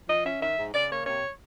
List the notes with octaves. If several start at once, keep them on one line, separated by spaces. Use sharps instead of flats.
F3 D#5
C#4 E5
D#3 E5
G#2
C#3 D5
A#3 C#5
C3 C#5